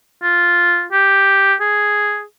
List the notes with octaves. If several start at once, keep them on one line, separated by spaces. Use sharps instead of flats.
F4
G4
G#4